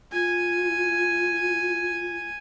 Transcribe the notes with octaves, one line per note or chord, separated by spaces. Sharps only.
F4 G#5